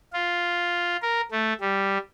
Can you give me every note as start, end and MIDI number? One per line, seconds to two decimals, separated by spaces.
0.13 0.97 65
1.02 1.21 70
1.31 1.53 57
1.61 1.98 55